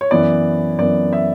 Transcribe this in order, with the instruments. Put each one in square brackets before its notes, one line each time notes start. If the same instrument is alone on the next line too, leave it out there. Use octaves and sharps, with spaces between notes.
[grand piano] C#5
F#2 E3 B3 D5
F#2 E3 B3 D5
E5